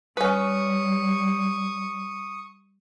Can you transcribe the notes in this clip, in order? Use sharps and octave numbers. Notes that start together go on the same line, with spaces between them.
G3 C#4 B4 C#6 D#6